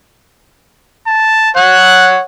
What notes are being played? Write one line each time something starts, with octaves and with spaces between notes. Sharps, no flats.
A5
C#5 F#5 F#6